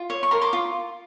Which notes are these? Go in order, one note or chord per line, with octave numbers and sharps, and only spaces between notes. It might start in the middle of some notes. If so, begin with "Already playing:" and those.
Already playing: F4
C#5
C#6
A#4 A#5 C6
C6 D6
F4